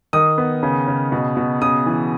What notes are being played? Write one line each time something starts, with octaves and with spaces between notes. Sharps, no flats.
D#3 D#6
B3
C#3
C#3
B2
B2
C#3 D#6
E3